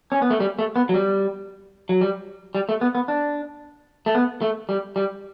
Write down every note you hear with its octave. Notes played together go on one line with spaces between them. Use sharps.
C#4
B3
A3
G3
A3
B3
F#3
G3
F#3
G3
G3
A3
B3
B3
D4
A3
B3
A3
G3
G3